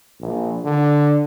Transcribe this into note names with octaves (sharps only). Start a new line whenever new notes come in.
A#1
D3